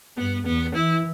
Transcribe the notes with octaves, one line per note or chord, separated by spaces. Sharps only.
G2 B3
E2 B3
E3 E4